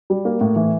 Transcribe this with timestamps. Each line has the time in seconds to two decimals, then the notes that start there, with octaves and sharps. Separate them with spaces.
0.10 G3
0.25 A#3
0.41 A2
0.56 E3